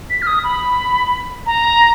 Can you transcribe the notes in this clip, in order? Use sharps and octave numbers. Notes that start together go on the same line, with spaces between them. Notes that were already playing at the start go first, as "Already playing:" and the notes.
B6
F6
D#6
B5
A#5